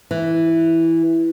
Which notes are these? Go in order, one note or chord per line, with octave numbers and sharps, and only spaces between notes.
E3